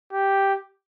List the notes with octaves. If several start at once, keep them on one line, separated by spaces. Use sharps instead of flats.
G4